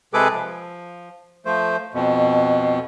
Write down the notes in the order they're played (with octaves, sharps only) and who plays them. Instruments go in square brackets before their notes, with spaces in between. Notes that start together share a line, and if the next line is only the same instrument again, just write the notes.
[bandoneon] C3 G#3 G#4 A4 B4 D6
F3
F3 A3 C5
F2 B2